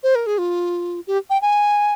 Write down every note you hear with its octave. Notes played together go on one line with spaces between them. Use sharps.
C5
A#4
G#4
F4
G4
G5
G#5